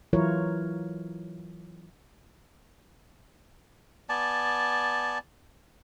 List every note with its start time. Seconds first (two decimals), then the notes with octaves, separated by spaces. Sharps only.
0.13 E3 F#3 E4 F4 A#4 C#5
4.09 B3 D5 G#5 A5